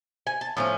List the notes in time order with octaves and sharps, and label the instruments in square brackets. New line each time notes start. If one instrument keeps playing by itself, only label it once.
[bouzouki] G#5
A5
A2 F3 C#4